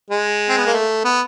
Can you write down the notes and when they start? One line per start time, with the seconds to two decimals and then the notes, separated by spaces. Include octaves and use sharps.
0.11 G#3
0.49 C4
0.57 B3
0.66 A#3
0.73 A3
1.04 B3